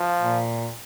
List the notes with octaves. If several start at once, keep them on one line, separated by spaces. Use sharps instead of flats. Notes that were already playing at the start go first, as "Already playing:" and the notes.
Already playing: F3
A#2